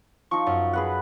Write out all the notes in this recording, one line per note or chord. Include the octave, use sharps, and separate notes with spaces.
F3 D#4 C#6
F#2
G#4 B4 F#5